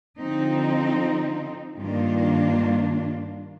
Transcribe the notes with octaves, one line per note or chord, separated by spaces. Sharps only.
D3 F3 C4 D#4
G2 D#3 A#3 D4 F4